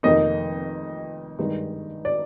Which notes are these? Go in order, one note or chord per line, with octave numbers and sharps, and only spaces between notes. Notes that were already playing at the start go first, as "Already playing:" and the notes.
F1 F2 D#3 A#3 D#4 D#5
G2 D#3 G#3 D#4
D5